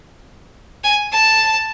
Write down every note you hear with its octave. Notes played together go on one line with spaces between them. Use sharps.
G#5
A5